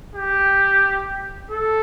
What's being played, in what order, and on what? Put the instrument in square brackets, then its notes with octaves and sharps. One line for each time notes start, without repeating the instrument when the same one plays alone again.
[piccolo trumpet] G4
A4